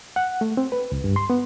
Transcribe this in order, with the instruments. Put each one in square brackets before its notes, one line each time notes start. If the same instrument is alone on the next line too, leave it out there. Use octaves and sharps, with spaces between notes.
[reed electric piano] F#5
A3
C4
B4
C#2
G2
C6
B3